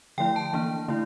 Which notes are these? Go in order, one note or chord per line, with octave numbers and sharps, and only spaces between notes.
D3 F3 A3 E4 G5
A5
E3 A#3 D4
D3 A3 E4